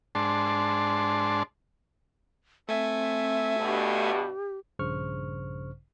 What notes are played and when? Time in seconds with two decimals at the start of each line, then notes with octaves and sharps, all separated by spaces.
0.15 G#2 D4 A5 C6
2.69 A3 C4 E5 G#5
3.60 G2 B2 G4
4.79 A#1 G2 C#3 C5 C#6 F6